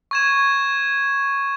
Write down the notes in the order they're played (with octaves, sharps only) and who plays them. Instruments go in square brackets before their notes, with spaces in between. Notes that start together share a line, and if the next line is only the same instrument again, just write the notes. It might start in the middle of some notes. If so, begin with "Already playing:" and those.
[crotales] C#6 G#6 E7